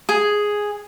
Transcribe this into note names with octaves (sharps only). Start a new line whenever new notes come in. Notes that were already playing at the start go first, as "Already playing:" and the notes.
G#4